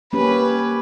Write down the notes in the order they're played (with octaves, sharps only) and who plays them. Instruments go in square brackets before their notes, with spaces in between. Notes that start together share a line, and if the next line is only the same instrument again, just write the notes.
[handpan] A#3 C#4 G4 [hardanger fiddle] B4